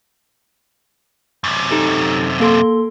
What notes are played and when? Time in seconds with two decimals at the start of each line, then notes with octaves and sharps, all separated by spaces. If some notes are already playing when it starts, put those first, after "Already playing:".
1.44 F#2 C3
1.71 D#4 G4 A4
2.40 A#3 A4 C6